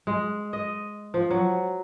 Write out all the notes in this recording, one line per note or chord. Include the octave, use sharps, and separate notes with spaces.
G#3
D#5
F3
F#3